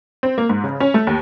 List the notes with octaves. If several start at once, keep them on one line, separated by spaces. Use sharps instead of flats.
C4
A#3
G#2
C#3
C#4
A3
D#2